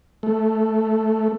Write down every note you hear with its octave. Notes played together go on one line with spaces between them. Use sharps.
A3